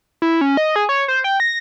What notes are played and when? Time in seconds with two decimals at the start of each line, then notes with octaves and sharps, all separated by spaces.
0.22 E4
0.41 C#4
0.57 D#5
0.76 G#4
0.89 C#5
1.08 C5
1.24 G5
1.40 A#6